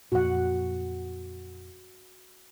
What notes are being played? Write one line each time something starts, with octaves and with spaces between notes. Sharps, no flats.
F2 A#2 F#4 F#5